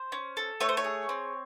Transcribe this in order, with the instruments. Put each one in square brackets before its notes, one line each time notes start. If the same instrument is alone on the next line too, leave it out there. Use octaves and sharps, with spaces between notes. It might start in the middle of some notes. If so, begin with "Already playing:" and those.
Already playing: [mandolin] C5
C#4
A4
A3 C#5
C5
C#5
G#4
C4